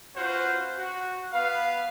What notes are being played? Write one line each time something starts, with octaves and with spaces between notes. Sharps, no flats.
C#4 F4 F#4 B4 C5
F#4
B3 B4 F5